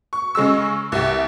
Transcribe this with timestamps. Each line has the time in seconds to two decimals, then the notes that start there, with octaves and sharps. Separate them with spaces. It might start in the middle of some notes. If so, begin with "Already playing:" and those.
0.13 C#6
0.35 C#3 G#3 C#6 E6
0.92 C2 G4